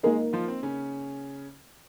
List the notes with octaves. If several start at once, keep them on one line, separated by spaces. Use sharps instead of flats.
G#3 A#3 D#4 G#4 A#4 D#5
F3 F4
C4
C#3 C#4